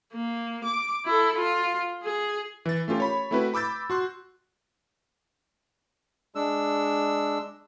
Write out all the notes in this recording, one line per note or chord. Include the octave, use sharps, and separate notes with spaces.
A#3
D6
E4 A4
F4
G#4
E3 A6
A3 C#4 F4 G4 A#4
C#5 B5
A3 C4 E4 F#4 B4
B5 D6 E6 G6 A6
F#4 C6 F#6
G#3 D4 E6